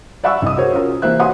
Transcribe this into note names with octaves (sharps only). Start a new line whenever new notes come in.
D5 E5 F#5 B5 C#6 E6
C2 D#5 D#6
F#4 G#4 A#4 C5 C#5
C#4 F4 F#4 A#4
C3 E3 A#3 C5 E5 F#6
F#4 B4 C#5 F#5 C6 D#6